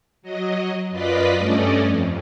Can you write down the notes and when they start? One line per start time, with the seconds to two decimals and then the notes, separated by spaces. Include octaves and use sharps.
0.22 F#3 D#5
0.90 F#2 F4 B4 D5 D#5 B6
1.38 G2 A3 C#4 D5 D#5
1.83 F2